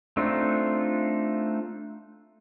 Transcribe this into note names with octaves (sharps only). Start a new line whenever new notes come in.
A3 C4 D4 D#4 F4